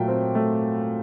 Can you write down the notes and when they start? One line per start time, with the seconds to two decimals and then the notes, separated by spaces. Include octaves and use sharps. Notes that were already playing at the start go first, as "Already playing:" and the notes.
Already playing: A#2 F#3 A3 G5
0.08 C4
0.35 A3